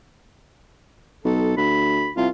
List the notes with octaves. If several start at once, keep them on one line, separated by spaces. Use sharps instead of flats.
B1 A4
D2 B5
C2 F4